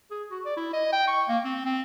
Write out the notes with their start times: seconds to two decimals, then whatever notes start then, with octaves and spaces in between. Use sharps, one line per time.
0.11 G#4
0.31 F#4
0.45 D5
0.57 E4
0.73 D#5
0.93 G5
1.08 C#6
1.28 A#3
1.44 C4
1.66 C4